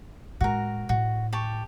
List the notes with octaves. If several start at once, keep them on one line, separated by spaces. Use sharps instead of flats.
A2 G#3 F#4 A#4
A2 F#4
G4 A5 C#6